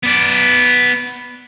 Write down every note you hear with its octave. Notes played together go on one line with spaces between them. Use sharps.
B3 D5